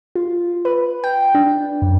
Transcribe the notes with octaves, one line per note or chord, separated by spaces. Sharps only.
F4
B4
G5
D4
F#2